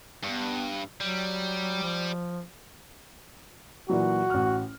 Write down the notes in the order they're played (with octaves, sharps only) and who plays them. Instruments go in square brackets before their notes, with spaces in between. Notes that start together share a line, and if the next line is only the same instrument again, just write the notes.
[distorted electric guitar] G2 [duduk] B3
[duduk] F#3 [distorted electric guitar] G3
[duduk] F3
[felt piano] A#2 E3 F#3 [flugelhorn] F#4
[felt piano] A1 F6